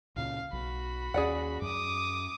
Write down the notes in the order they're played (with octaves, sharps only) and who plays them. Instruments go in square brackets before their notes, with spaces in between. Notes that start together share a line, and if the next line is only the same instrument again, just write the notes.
[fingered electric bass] C#2 A#2 C#3 [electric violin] F5
[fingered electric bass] B1 [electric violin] F#4 B5
[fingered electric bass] D#2 C#4 [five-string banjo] G#4 D5 F#5
[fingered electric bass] F#2 [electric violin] D6 D#6